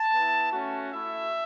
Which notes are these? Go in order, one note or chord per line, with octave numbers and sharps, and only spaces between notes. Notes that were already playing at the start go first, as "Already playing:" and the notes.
Already playing: A5
B3 E4
A3 C#4 F#4
A3 E4 E5